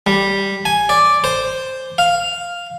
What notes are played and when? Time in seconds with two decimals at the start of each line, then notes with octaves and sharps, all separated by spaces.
0.07 G3
0.65 G#5
0.89 D5
1.24 C5
1.98 F5